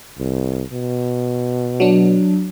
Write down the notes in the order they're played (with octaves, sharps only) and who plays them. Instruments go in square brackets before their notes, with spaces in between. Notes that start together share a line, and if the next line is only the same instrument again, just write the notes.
[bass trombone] C2
B2
[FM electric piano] F#3 D4